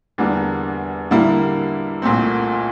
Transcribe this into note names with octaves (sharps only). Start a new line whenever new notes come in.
E2 D3 G3 A#3 D4
D3 G3 A#3 E4
C2 A#2 A3 C4